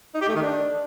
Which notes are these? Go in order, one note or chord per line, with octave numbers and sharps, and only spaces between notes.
D#4
G4
A3
D#3
D4